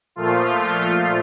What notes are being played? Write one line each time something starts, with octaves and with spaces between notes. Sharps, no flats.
A#2 F3 A3 F4